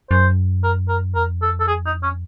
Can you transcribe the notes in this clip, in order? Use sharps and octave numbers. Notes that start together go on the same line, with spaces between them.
F#2 C5
A#4
A#4
F2 A#4
A4
A4
G#4
D#4
C#4